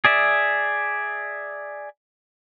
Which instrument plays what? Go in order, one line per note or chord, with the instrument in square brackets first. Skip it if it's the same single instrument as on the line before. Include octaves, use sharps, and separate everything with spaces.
[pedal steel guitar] G#4 D5 E5